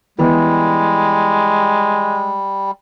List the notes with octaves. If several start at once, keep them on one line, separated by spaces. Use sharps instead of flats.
E3 G3 G#3 B3